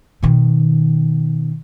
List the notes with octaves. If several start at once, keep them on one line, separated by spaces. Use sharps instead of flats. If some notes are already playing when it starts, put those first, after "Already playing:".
B2 D#3